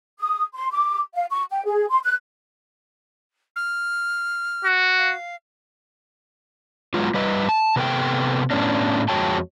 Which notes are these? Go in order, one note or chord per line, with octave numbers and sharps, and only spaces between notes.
D#6
C6
D6
F5
C#6
G5
G#4
C6
F#6
F6
F#4
F5
F#3 G#3 B3 F4
G3 B4 D#5
A5
C3 B3 A4 G5
A2 B3 C#4 D4
F2 G#3 F#4 C#5 G5 A5